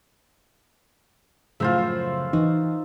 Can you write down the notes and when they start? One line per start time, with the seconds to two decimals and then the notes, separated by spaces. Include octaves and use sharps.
1.60 F#2 A2 C#3 F3 F4 C5 E5
2.33 E3 D#4 F#4